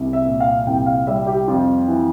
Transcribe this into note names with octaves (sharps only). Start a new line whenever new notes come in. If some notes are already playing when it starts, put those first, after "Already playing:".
Already playing: C2
E5
A#2
F5
C2 G5
F5
G3 E5
G4
F2 F4
E3